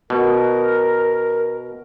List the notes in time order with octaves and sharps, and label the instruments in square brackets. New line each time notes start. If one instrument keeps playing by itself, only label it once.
[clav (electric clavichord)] B2 [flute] A#4